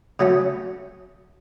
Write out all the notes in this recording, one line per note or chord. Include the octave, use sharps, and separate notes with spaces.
C#3 F#3 A3 C#4